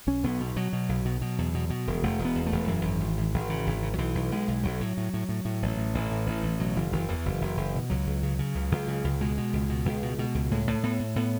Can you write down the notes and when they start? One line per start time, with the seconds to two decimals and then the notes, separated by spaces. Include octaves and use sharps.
0.07 B1 C#4
0.24 B1 B3
0.40 B2
0.56 B2 F#3
0.73 B2
0.89 B1
1.05 B2
1.21 B2
1.38 E2
1.54 B2
1.70 B2
1.87 E1
2.03 E1 A3
2.19 E1
2.25 B3
2.35 E2
2.47 A3
2.52 E1
2.68 F#2 E3
2.85 G#1
3.00 G#1
3.18 G#1
3.34 G#1
3.50 C#3
3.67 G#1
3.82 C#3
3.94 F#3
3.98 B1 E3
4.15 B1
4.32 B1 G#3
4.48 B1
4.63 B1 F#3
4.81 A2
4.97 A2
5.14 A2
5.29 A2
5.45 A2
5.62 A1
5.78 A2
5.94 A1 E3
6.11 A2
6.27 A1
6.43 A1
6.60 B2 F#3
6.76 F#1 E3
6.92 F#1 E3
7.08 E2 E3
7.25 F#1
7.41 F#1
7.57 F#1
7.74 B2
7.90 C#2 F#3
8.07 C#2
8.23 C#3
8.39 C#3
8.55 C#2
8.72 C#2
8.88 C#3
9.04 C#2
9.21 B2 G#3
9.37 B2
9.53 C#2
9.69 B2
9.86 C#2
10.02 B2
10.19 B2
10.35 C#2
10.51 A2 G#3
10.67 A2 A3
10.83 A2 B3
11.00 A2
11.16 A2 B3